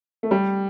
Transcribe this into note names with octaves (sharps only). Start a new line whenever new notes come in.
A3
G3